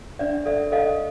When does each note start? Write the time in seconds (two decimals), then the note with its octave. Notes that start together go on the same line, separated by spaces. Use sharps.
0.19 D4 D5 E5
0.46 A4 D5 E5
0.72 A4 D#5 F5